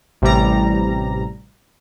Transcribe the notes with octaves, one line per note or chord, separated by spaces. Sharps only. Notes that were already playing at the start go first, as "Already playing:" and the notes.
A1 C3 G3 A#5